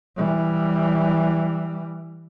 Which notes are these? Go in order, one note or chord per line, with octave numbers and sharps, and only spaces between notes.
E3 G3